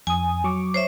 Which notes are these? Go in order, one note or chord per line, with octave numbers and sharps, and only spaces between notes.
F2 G#5 D#6
F#3 C#6 D6
C5 C#5 E5